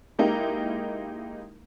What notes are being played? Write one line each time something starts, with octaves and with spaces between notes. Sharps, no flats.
G#3 A#3 D#4 E4 G4 A#4